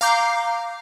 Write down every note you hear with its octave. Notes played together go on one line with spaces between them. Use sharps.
F5 A#5 D6 G6 C7